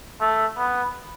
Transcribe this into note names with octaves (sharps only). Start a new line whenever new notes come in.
A3
B3